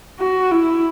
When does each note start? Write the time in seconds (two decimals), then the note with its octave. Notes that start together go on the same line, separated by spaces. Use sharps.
0.19 F#4
0.51 E4